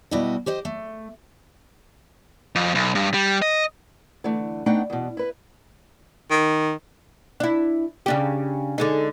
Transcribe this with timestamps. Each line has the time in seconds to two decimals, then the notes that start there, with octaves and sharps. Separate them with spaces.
0.11 B2 G3 E4 F#4 D#5
0.46 G4 C5 D#5
0.65 A3
2.55 F2
2.75 B1
2.95 G2
3.14 G3
3.42 D#5
4.24 D3 E3 A3
4.66 A3 B3 D4 D#4 F#5 G5
4.90 E2 B2
5.17 E4 B4
6.30 D#3
7.40 D4 E4
8.06 C#3 D4 G4
8.78 D3 G#3 D#4